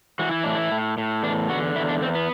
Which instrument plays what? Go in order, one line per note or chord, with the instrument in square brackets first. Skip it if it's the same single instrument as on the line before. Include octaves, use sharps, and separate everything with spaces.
[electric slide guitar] E3 F#4
E4
A2 D4
E4
A2
A2
E2 D4
D3 F#4
E2 E4
D4
E2 C4
B3